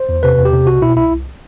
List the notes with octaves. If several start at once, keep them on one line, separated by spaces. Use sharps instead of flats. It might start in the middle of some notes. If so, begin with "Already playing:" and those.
Already playing: C5
E2
C3 B4
E2
G4
C3
C2 F#4
B2 E4
C2 E4
C2